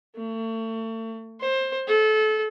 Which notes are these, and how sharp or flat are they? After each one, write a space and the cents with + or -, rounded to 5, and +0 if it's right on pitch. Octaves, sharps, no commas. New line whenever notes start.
A3 +35
C5 +20
A4 -30